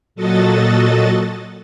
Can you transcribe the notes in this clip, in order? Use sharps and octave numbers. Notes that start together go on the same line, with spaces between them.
A#2 F#3 F#4 A4 D#5 A6